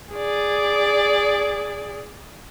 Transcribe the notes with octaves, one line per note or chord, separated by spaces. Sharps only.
G#4 D5